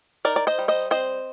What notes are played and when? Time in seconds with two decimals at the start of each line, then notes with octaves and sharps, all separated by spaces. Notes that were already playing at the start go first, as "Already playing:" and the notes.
0.25 D#4 A#4 D5
0.36 D5
0.47 C5 D#5
0.58 G3
0.68 C5 D#5
0.91 C4 C5 D#5